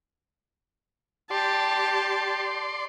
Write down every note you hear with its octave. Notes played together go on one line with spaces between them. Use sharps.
G4 D5 A5 C6